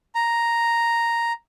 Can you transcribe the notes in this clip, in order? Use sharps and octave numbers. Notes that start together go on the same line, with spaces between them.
A#5